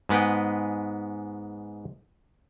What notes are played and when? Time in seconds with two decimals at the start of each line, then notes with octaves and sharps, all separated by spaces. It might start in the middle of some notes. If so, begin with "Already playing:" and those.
0.09 G#2 G#3 B3 B4 G5